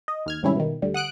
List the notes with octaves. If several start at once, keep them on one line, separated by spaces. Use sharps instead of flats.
D#5
D#2 F6 G#6
G#2 C3 D#3 G3 C#4 E4
B2 D#3
D2 D3 G3
F#5 D#6 F#6 D7